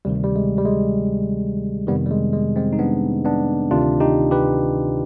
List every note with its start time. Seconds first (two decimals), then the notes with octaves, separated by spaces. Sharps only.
0.05 D2 C3 D#3 G3
0.24 G3
0.36 G#3
0.58 G3
0.66 G#3
1.87 F2 C3 D#3 G3 B3
2.06 G3
2.11 G#3
2.33 G#3
2.56 G#3 C4
2.73 D#4
2.79 B3 D4
3.25 B3 D4
3.71 D2 C3 D#3 D4 F4
4.00 D#4 G4
4.31 G4 B4